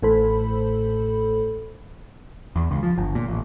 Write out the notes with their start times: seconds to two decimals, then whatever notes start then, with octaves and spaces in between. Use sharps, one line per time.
0.03 A1 A2 A4 C5 B5
2.56 E2
2.71 C#2
2.83 F3
2.98 G1
3.15 A#2
3.28 A1